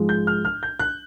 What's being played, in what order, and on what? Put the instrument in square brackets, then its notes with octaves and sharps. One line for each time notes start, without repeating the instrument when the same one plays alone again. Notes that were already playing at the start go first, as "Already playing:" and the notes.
Already playing: [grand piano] G#2 F3 G#3
G6
F6
F6
G6
F#6